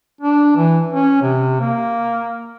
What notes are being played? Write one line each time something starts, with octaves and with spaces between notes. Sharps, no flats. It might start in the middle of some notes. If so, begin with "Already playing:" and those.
D4
E3
C#4
C3
A#3